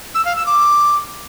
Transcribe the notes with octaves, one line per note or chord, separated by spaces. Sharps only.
E6
F5
E6
D6